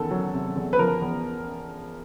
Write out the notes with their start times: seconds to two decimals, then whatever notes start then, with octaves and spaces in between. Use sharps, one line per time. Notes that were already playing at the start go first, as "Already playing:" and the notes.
Already playing: E2 D#3 A4
0.11 F#3
0.34 C3
0.56 E2
0.73 B4
0.79 F3 A#4
1.02 E2